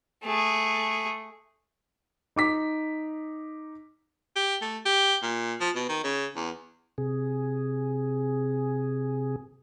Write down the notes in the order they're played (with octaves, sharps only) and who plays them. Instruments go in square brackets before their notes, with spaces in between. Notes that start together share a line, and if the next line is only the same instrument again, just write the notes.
[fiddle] A3 G#4
[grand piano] D#4 D6 B6
[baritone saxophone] G4
A3
G4
A#2
F3
B2
D#3
C#3
E2
[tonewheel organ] C3 G#4